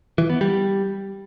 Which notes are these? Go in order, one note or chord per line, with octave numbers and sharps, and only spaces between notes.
E3
B3
G3